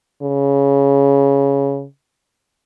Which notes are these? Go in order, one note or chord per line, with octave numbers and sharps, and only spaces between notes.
C#3